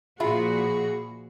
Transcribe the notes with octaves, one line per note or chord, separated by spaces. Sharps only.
A#2 F3 F4 F#4 G#4 E5 B5